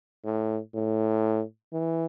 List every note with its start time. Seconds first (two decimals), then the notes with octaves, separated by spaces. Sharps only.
0.25 A2
0.74 A2
1.73 E3